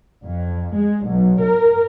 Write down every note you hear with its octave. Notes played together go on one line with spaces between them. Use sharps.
F2
G#3
B1
A#4